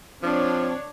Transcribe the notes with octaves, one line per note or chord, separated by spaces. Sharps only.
F3 C4 D4 C#5